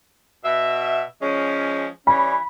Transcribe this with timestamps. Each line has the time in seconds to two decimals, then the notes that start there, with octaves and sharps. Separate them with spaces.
0.44 B2 E5
1.22 F3 G#3 C#4
2.07 E3 G3 C#4 B5